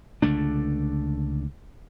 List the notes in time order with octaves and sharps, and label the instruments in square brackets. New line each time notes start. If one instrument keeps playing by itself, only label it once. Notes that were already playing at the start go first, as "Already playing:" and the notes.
[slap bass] C#2 D3 A3 D4